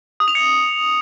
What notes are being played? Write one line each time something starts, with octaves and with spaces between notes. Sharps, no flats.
D#6
F7
C#7